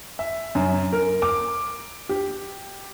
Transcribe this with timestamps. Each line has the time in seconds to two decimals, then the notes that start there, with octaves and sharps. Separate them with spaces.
0.19 E5
0.55 F#2
0.93 A#4
1.22 D6
2.09 G4